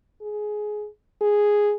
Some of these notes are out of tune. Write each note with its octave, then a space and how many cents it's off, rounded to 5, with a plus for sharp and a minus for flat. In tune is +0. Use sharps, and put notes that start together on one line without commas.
G#4 +15
G#4 -5